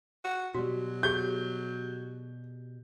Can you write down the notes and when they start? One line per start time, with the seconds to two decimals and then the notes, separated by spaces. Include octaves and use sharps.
0.24 F#4
0.54 B2 F#3 G3 F#4
1.03 G4 G#4 G6